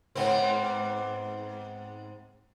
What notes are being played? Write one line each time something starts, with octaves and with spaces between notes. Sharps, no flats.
G#2 B3 C4